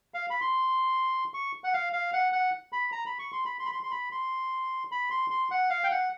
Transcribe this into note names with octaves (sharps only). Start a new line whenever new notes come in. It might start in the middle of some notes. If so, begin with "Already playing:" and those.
F5
B5
C6
C#6
F#5
F5
F5
F#5
F#5
B5
A#5
B5
C#6
C6
B5
C6
B5
C6
C6
B5
C6
B5
C6
C6
F#5
F5
G5
F#5